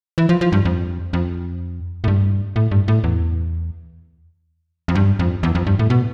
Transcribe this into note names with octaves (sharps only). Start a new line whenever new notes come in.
E3
F3
F3
G2
F2
F2
A2
G2
A2
G2
A2
E2
F2
G2
F2
E2
F2
G2
A2
B2